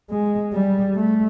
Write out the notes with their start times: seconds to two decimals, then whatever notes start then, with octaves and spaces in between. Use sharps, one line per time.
0.10 G#3
0.53 G3
0.96 A3